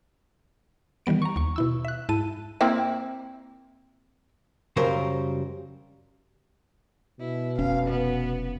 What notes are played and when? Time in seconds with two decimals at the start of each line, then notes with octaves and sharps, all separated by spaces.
1.06 D#3 E3 G3 B3 D7
1.22 A#5 C#6
1.36 D#2 C#6
1.56 B2 E4 E6
1.85 E5 F#6
2.09 G#2 E4 A5 D#7
2.61 A#3 C4 E4
4.76 F#2 C#3 F#3 G3 A#4 C5
7.20 B2 E4
7.59 F1 C#4 F5
7.87 B3